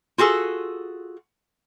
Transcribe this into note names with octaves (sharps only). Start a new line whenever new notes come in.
F4 F#4 G#4 A4